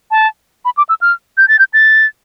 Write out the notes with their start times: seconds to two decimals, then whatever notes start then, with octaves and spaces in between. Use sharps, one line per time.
0.11 A5
0.65 B5
0.77 D6
0.89 E6
1.01 F6
1.37 G6
1.48 A6
1.59 G6
1.74 A6